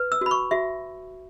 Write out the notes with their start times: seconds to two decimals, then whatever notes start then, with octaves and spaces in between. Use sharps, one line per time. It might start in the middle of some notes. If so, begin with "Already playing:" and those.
Already playing: B4
0.12 E6
0.21 F#4 B5
0.31 C#6
0.51 F#4 E5